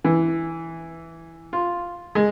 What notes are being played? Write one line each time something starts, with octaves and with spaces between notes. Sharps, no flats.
E3
F4
G#3